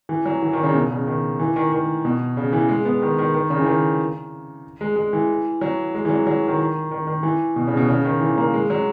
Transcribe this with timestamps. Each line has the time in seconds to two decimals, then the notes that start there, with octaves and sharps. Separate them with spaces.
0.09 E3
0.25 F#3
0.43 E3
0.53 D#3
0.63 C#3
0.74 B2
0.91 C#3
1.07 D#3
1.39 E3
1.56 D#3
1.72 D#3
2.05 B2
2.37 C#3
2.53 E3
2.69 G#3
2.85 B3
3.02 D#3
3.18 D#3
3.34 D#3
3.50 C#3
3.59 E3
3.66 D#3
4.81 G#3
4.96 G#3
5.13 E3
5.61 F#3
5.94 G#3
6.05 E3
6.09 F#3
6.27 F#3
6.48 D#3
6.91 D#3
7.07 D#3
7.23 E3
7.56 B2
7.67 C#3
7.77 B2
7.89 C#3
8.05 D#3
8.21 E3
8.37 A#3
8.54 G#3
8.70 F#3